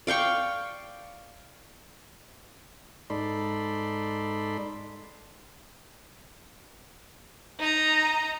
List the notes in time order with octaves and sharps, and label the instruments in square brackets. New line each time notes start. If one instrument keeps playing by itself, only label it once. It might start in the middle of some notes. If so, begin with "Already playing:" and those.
[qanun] D5 F5 G5 C#6
[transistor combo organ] G#2 D#4 A4 D5 B5 C6
[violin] D#4 A#5